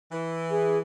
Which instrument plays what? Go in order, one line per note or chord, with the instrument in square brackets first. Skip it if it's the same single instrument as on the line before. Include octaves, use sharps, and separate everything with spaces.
[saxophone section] E3
[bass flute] G#4